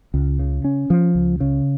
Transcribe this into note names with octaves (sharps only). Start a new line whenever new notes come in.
C#2
C#3
C#4
F3
C#2
C#3